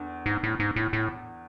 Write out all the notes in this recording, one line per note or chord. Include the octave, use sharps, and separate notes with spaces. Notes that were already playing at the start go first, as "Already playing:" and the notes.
Already playing: E2 D3
G#2
A2
G#2
A2
A2